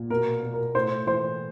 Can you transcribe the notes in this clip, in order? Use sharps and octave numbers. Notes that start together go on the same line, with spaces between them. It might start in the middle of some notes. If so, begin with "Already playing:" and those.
Already playing: A#2
B2 A#4
B2
A#4
A2 C5
E3 C5